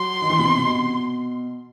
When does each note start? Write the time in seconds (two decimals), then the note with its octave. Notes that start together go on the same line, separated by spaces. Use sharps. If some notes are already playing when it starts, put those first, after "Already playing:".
Already playing: F#3 C6
0.22 D#3
0.30 E3
0.39 B2
0.44 C3
0.58 B2